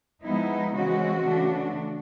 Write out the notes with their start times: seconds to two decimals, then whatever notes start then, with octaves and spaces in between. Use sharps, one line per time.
0.24 F3 G#3 B3 D#4 E4
0.75 C#3 E3 G#3 C4 F#4
1.26 C#3 E3 A3 D4